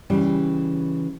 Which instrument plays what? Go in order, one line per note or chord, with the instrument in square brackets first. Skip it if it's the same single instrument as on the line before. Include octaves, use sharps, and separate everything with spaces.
[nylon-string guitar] C#3 E3 G3